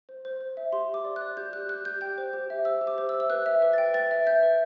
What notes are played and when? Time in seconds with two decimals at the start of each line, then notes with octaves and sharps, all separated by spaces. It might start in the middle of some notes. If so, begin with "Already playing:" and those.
0.09 C5
0.25 C5
0.41 C5
0.57 E5
0.72 G4 C6
0.89 G4 D6
1.04 D5
1.16 F#6
1.21 D5
1.37 G4 G6
1.53 G4 F#6
1.69 G4 F#6
1.85 G4 G6
2.01 G5 G6
2.18 C5
2.33 G4
2.50 E5
2.65 C5 E6
2.81 G4
2.87 D6
2.98 C5
3.09 E6
3.15 E5
3.20 E6
3.30 B4 F#6
3.46 E5
3.62 B4
3.73 G5 A6
3.94 B4 A6
4.11 E5
4.27 E5 G6
4.43 B4